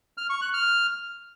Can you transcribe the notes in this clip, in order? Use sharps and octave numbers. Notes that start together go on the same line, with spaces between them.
F6
C#6
F#6
F6